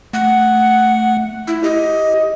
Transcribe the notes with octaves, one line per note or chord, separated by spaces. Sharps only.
A3 F#5
E4
G4 D#5